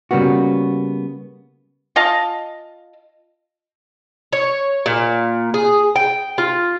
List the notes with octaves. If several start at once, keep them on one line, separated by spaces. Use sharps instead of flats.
C#3 G3 A#3 B3 F#4
F4 D#5 F5 A5
C#5
A#2
G#4
G5
F4